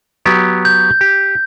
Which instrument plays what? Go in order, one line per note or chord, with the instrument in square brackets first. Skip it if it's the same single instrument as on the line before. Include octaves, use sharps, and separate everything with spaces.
[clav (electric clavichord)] F#3 B3 G4
[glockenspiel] G6
[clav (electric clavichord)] G4